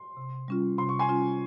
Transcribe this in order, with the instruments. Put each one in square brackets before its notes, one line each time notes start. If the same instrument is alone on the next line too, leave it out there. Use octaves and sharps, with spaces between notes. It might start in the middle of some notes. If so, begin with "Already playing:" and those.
Already playing: [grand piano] C6
[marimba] C3
G3 C#4 F4
[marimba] C3 [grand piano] C6
[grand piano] C#6
G#5 C6
[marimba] G3 C#4 F4